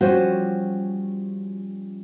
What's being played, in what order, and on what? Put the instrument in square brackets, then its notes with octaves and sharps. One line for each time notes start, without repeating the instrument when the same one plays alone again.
[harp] F3 G3 C#4 [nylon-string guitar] F#4 C5